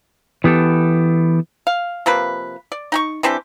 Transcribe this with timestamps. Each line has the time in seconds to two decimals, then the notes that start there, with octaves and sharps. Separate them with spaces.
0.44 E3 B3 G4 A4
1.67 F5
2.06 C3 F3 A#3 B4
2.72 D5
2.92 D#4 G5 C#6
3.23 E3 C4 D4 G4